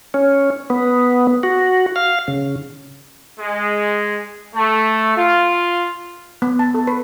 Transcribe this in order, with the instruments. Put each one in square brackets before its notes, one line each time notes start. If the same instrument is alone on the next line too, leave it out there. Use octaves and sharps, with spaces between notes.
[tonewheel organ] C#4
B3
F#4
F5
C#3
[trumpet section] G#3
A3
F4
[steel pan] B3
A5
A4
B4